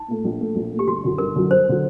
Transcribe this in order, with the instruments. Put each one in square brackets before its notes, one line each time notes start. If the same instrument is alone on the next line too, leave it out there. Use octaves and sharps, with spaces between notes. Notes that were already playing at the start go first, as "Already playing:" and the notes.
Already playing: [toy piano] D#4
[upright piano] A#2 A3
A#1
A#2 A3
A#1
A#2 A3
[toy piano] G4
[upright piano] G1 [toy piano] F#4
[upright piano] F#2 D3 F#3
[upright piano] G1 [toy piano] A#4
[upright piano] F#2 D3 F#3
[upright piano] G1 [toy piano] C5
[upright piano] D3 F#3